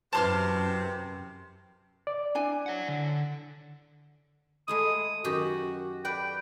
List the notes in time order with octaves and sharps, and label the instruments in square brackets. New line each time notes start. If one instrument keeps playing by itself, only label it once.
[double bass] F#2 [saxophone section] C3 [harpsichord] E3 C5 [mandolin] A5 C6 F6
[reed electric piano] D5
[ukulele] D4 E4 G#5
[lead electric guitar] C#5 F#5
D3
[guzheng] G#3 A3 E4 [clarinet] D#6
[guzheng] F#2 D#3 G4 [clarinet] F#4
[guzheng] B4 D5 F#5 [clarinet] G5